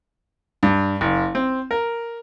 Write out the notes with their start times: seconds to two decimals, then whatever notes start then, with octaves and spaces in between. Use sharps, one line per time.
0.63 G2
1.01 F#1
1.35 C4
1.71 A#4